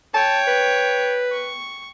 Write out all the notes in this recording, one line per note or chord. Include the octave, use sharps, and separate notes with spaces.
C#5 G5 A5
B4
C#6